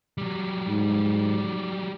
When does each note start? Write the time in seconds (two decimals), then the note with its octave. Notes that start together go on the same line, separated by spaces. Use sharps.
0.18 F#3 G3
0.67 G#2